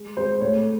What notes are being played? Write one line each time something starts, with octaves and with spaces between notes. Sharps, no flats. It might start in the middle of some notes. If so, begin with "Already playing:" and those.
Already playing: G#3
G#3 C5
A2 C#5